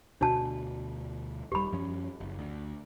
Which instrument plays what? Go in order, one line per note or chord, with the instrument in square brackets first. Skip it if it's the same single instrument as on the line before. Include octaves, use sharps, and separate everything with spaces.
[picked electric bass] D2 B2 [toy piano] D4 F#4 A5
[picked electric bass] D#1 G3 [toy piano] G4 B5
[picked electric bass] F#2 F3 C#4
F#1
D2